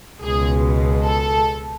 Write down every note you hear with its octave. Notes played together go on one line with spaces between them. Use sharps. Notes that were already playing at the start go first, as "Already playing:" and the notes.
C#2 B2 G#3 G#4
A4